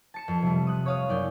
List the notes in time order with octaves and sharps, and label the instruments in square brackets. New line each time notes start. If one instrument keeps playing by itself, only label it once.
[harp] A5 C#7 E7
F2
C3 G3
D#6 F#6
C#5 F5 D#6
F#1 D5 G6